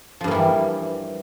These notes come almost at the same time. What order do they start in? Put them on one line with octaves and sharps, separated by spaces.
F3 G2 A#3 E3 G3